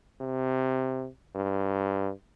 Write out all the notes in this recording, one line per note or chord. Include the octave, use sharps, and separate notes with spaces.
C3
G2